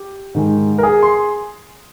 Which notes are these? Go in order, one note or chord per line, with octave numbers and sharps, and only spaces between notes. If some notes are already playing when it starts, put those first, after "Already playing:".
Already playing: G4
G#2 D#3 G#3
A#4
G#4
C6